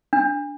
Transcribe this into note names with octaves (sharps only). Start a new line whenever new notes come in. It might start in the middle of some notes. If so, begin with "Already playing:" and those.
D4